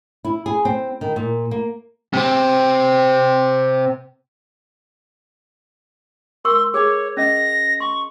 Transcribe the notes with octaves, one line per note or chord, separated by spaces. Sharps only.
E4
G#4
C4
D#3
A#2
A#3
C3 C4
A#4 C6 C#6 E6
G#4 C#5
C#4 D#5 A#6
C6 C#6